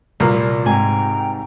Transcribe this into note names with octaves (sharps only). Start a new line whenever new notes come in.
C2 A#2 A#3 B4
G#2 C3 G5 G#5 A#5